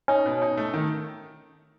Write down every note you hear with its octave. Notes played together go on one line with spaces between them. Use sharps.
C#4 D#4
B2
D#4
A3
D#3